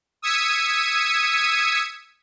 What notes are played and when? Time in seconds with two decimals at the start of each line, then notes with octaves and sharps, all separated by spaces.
0.22 D#6 E6 G#6 B6 C#7 D#7